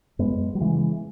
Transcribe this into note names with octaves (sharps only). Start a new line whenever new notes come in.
F#2 G#3 B3
F#3
C#3 E3 G#3